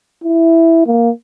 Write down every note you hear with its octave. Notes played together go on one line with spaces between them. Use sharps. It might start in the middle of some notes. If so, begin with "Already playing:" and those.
E4
A#3